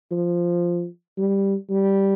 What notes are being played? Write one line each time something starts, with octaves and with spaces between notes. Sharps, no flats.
F3
G3
G3